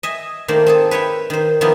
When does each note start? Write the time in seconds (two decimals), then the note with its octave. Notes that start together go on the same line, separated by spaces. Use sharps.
0.03 D#5 E5 G#5
0.48 D#3 A3 A#3 C5 D5
0.66 C4 G#4 A4
0.91 B4 C#5 E5 G5
1.30 D#3 C5
1.61 D#3 F3 A#3 B3 D#4 E4